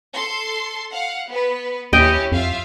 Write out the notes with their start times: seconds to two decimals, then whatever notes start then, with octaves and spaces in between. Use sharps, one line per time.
0.13 A4 C6
0.91 F5 F#5
1.27 B3 B4
1.93 D#2 C#4 E4 G4 D#5 G5
2.32 F2 F4 E5 F5